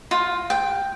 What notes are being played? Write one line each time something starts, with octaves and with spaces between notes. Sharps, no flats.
F4
G5